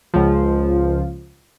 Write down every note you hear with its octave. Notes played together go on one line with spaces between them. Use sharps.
C#2 F3